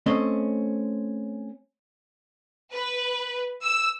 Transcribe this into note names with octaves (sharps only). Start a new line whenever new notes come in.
A3 C4 C#4 D#5
B4
E6